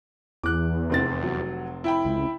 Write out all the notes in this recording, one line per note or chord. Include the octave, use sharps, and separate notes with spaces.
E2 D6 F#6
F1 C4 A6
F#3
E4 G5 B5
C#2